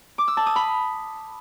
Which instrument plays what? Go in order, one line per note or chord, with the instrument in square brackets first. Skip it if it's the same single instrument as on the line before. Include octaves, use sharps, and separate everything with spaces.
[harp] D6
E6
A5
D#6
B5